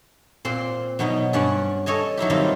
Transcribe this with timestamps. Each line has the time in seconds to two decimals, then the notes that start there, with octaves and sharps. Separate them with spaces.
0.45 A#2 C4 C6
0.99 B2 F#3 B3 D#4
1.33 G2 C#4 D5 F#5 G#5
1.86 A4 C#5 D#5 G#5
2.17 F#3 D#4 E4 G4
2.30 D#3 G3 C4 D#4 F4 G4